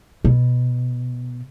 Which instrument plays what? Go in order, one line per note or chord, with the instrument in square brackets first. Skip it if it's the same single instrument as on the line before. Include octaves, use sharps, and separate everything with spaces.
[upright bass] B2